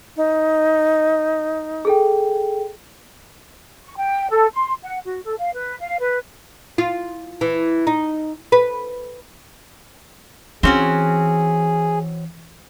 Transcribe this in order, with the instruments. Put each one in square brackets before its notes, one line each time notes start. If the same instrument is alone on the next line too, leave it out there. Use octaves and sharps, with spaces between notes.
[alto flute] D#4
[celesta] G#4 A4 G5
[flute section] C#6
G5
A4
C6
F#5
F#4
A4
F5
B4
F5
B4
[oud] F4
E3
D#4
B4
[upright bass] E3 [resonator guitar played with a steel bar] C4 C#4 F#4 [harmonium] G#4